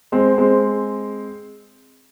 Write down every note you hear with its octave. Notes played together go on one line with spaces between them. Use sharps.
G#3 C4
G#3 C4